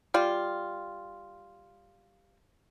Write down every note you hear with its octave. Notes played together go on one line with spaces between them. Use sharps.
G3 F4